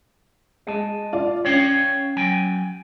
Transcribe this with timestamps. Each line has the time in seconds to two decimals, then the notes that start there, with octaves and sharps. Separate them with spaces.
0.67 G#3 D#5 A5
1.13 F4 D5
1.45 C#4 C#5 F5 G5
2.17 F#3 G5 G#5